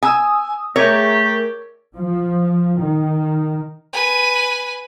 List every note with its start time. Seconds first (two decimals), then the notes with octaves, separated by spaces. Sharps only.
0.03 G#5 D#6 E6
0.76 A3 G4 G#4 A#4 C#5
1.98 F3
2.80 D#3
3.93 B4 G#5